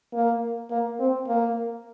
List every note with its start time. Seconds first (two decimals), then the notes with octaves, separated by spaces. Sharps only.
0.14 A#3
0.70 A#3
1.00 C4
1.27 A#3